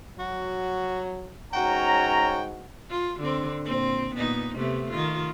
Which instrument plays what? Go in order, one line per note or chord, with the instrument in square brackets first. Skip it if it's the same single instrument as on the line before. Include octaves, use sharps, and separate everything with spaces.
[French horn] F#3 [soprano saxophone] F#4
[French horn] G#2 [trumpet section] C#4 C#5 A#5 [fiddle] F#4 [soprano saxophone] G5
[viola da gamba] F4
D3 C4
A#2 C4
A#2 B3 D#4
C3 A3 B3
D#3 F4